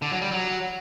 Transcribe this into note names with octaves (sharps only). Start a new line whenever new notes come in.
D3
F#3
G3
F#3